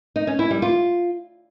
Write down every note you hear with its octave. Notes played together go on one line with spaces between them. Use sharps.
D#4
C#4
E4
G3
F4